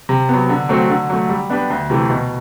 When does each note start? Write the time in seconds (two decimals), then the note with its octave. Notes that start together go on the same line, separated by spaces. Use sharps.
0.09 C3
0.29 F#3 B3
0.49 D3
0.69 F#3 A3 C4 F#4
0.89 D3
1.10 F#3 A3
1.29 G3
1.50 B3 D4 G4 B4
1.70 D2
1.90 C3 E3 A3
2.10 B2